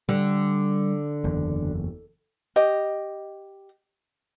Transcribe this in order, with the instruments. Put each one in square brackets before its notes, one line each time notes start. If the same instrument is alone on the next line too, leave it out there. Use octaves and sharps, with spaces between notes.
[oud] D3 [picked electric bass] G3
[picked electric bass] F#1 E2
[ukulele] G4 D#5